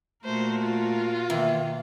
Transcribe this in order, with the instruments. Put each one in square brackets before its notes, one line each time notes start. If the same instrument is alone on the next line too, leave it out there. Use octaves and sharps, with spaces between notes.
[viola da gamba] A#2 F#4 A#4 [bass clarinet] A3 [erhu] C5
[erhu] F4
[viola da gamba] B2 A#3 [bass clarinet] D#3 [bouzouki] E3